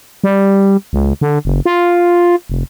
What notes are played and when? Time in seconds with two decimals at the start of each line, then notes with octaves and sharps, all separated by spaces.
0.24 G3
0.93 C#2
1.21 D3
1.45 F#1
1.66 F4
2.49 F1